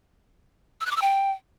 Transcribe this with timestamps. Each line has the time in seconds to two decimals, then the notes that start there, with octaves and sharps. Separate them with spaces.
0.81 E6
0.86 F#6
0.91 D6
0.96 E6
1.02 G5